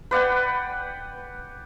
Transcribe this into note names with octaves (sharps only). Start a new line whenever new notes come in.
B4 D5 F#5 G5